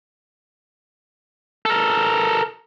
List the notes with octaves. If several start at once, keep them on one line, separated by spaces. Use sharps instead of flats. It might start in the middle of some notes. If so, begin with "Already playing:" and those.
A4 A#4